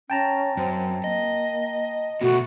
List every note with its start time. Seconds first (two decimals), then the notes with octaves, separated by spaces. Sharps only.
0.10 C#4 G5 A5 A#5
0.57 F#2 C4
1.04 A#3 D#5
2.21 B2 A3 B3 F#4